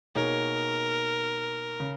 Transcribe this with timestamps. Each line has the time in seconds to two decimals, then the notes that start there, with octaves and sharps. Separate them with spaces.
0.15 B2 A#3 D#4 G#4 A#4 C#5
1.80 C#3